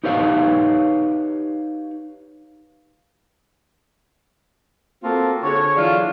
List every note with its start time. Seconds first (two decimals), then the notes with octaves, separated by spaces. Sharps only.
0.04 D#4 G4 B4 C#5 F5
5.03 A#3 C4 F4 F#4 A4
5.44 D3 G#4 C#5
5.76 E3 F#3 D4 F4 F5